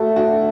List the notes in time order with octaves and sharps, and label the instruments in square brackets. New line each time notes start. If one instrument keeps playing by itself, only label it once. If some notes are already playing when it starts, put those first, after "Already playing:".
Already playing: [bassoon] A3 [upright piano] F#4 A4
[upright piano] D4 F#4